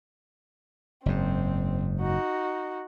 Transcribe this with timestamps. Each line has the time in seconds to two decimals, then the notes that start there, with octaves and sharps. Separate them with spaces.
1.06 F#1 G#2 C4
2.00 D#4 F#4